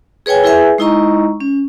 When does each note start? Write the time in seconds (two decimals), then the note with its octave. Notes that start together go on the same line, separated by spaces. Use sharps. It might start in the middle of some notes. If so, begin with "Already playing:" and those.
0.26 G#4 B4 C#5 G5 G#5
0.44 E4 G#4 B4 E5 G#5
0.78 G#3 D#4 E4 D#5 A#5 C#6
1.40 C#4